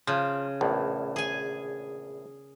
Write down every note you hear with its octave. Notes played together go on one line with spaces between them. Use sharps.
C#3 F3
A#1 E2 A2
G#4 G#5